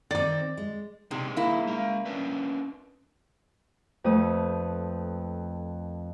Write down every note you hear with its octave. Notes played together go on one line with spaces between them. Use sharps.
D#3 C4 D5 D6
G#3
C3 D4 D#4 G#4
A#3 E4
G#3 F5
C#4 D4 B4
F2 A3 B4 D#6